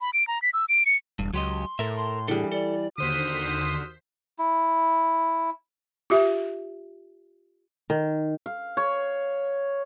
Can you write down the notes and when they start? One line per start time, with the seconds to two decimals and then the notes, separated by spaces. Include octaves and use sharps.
0.01 B5
0.13 D7
0.28 A#5
0.42 B6
0.54 E6
0.69 D7
0.86 C#7
1.19 E1 G2
1.33 C#2 F#3 G4 D#5 C6
1.79 A2 A4 A#4 E5
1.96 C6
2.28 E3 G3 D4 G#4 A4
2.52 A4 D5
2.98 D#2 D3 F#4 C5 D#6 F6 B6 D#7
4.39 E4
6.10 F4 G4 E5
7.90 D#3
8.46 F5
8.77 C#5